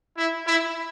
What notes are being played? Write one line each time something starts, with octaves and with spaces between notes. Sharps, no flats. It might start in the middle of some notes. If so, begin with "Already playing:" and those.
E4
E4